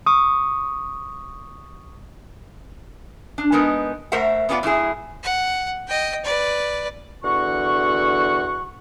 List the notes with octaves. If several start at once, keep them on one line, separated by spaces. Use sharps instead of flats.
C#6 D#6
D4
G#3 B3 D#4 A#4
A3 A#4 C5 E5 F#5
B3 C#4 F4 F#4 D5 F#5
F#2 A2 E4 G#4
F#5
D#5 G5
B4 D5
E2 D3 F#4 F#5 C#6